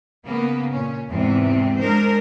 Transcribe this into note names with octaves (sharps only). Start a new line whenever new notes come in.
C#3 A#3 B3
A#2 C#4
E2 G#2 C3 E3 C4
G#3 D4 A#4 C5